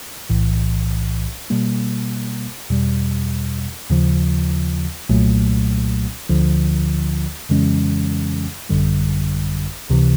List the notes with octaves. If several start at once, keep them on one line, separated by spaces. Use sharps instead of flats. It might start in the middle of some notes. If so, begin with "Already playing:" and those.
B1 A2 E3
B2 G3 A#3
E2 B2 G3
D#2 C#3 F3
C2 A#2 F#3 A3
D2 D3 F3
F2 C#3 E3 G#3 C#4
G#1 F#2 D3 G3
C#2 C3 E3